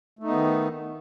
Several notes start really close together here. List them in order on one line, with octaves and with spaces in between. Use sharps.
A3 D#4 B3 D#3